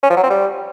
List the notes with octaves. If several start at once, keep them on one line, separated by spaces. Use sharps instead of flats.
C#4
F3
F#3
C4
G3